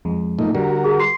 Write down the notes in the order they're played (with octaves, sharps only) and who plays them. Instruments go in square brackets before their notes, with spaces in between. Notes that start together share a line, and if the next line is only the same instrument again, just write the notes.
[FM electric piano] F2 G#3
[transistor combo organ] A#2 A3 D#4
[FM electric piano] D3 G3 [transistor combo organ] F#4 A#4
[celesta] G#4
C6 C7